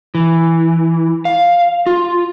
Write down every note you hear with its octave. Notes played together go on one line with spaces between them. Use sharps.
E3
F5
F4